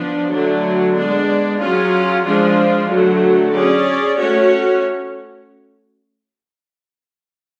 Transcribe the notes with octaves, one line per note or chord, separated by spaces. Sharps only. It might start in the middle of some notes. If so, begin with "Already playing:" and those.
Already playing: F3 B3 D4
D3 F#3 A3 D4
G#3 B3 D4
F#3 C#4 F4 G#4
F3 G#3 D4 F4 G#4
D3 F#3 A3
C#4 G#4 D5
A3 C#4 F#4 C#5